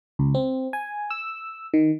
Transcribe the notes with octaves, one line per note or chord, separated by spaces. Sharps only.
C#2
C4
G#5
E6
D#3